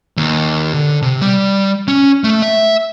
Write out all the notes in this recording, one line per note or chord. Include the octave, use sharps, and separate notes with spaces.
D#2
D3
C3
G3
C#4
A3
E5